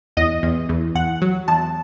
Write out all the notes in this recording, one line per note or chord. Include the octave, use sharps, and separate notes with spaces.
E2 D#5
E2
E2
E2 F#5
F#3
E2 A5